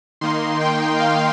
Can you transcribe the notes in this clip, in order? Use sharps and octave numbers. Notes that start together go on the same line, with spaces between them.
D#3 A#3 D#4 C6
G5
F5